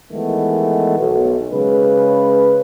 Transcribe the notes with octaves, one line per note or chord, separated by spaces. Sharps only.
D#3 E3 G#3 A3 B3
B1
C#3 G#3 B4